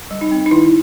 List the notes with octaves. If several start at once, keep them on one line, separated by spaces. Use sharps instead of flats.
G3
D#4
C4
D#4
D#3 E4